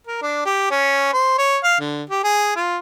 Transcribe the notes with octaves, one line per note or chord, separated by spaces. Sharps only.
A#4
D4
G4
C#4
C5
C#5
F5
D3
G4
G#4
F4